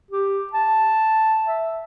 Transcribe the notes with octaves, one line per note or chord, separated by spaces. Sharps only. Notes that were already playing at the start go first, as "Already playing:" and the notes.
G4
A5
E5